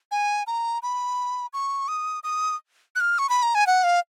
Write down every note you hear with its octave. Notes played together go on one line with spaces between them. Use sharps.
G#5
A#5
B5
C#6
D#6
D#6
F#6
F6
C#6
B5
A#5
G#5
F#5
F5